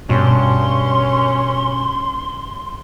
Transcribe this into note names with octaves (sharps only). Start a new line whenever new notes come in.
G2 B2 C#4 C6